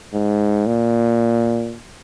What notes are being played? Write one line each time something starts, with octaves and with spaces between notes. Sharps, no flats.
G#2
A#2